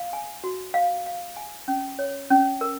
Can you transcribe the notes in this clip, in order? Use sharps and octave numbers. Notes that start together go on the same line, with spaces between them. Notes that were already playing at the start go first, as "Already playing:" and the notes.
Already playing: F5
G#5
F#4
F5
F5
G#5
C#4
C#5
C#4
A#4